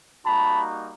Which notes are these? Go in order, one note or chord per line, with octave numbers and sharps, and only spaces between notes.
G3 A#3 D#4 F#4 A5 B5